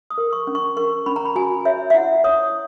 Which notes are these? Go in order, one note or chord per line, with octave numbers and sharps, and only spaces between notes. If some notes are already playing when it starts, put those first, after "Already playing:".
D#6
A#4
C#6
C#4
C#6
A#4 C#6
C#4 B5
A#5
B5
F#4 G#5
C#5 E5
E5
E4 F#5
C#5 D#6